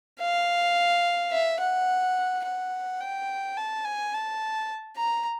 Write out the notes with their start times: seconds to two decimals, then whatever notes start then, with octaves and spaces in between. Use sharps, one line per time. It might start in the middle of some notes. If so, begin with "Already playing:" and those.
0.20 F5
1.32 E5
1.60 F#5
2.44 F#5
3.00 G5
3.57 A5
3.85 G#5
4.13 A5
4.96 A#5